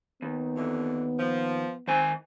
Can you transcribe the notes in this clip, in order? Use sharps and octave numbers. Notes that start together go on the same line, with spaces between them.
D#2 B3
F2 D3 E3
F3
D#3 C4 G#5